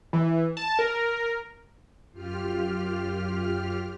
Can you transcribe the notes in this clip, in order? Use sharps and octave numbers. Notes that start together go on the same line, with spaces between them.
E3
A5
A#4
F#2 F4 G4 F6